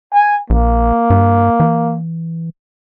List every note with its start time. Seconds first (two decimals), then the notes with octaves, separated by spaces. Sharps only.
0.13 G#5
0.50 A#1 A#3
1.10 G2
1.60 E3